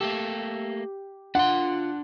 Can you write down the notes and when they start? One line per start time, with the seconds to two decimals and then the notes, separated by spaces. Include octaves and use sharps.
0.01 A3 A#3 G4 A4
1.35 D4 F4 F#5 C6